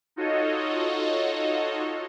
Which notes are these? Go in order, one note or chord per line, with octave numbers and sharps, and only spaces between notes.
D#4 F4 F#4 A4 C#5 D#5